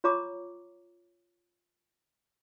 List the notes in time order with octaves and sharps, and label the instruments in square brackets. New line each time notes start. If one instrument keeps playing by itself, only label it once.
[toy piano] F4 C#5 A#5 C#6 D6